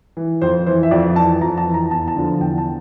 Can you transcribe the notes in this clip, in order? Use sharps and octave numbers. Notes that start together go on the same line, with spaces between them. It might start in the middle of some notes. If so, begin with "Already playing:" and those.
E3
F2 C5
E3 C5
E5
F2 D5
E3 A5
F2 A#5
A5
E3
A#5
E2 A5
A5
D3 F3
A5
E2 G5
A5